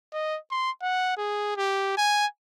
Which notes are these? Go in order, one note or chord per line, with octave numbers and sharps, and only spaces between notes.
D#5
C6
F#5
G#4
G4
G#5